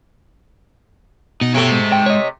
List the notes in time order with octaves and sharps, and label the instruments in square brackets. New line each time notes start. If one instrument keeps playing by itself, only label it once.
[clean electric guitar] B2 [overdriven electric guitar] D#4 D#5
[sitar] C3 A3 [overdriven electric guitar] C#5 G5
[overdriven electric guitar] G#3 C5
[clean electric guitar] G5
C#5 D#5